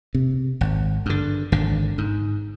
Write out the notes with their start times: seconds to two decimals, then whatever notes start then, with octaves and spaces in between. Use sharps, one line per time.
0.15 C3
0.61 G#1
1.06 G2 D3
1.52 G#1 D3
1.98 G#2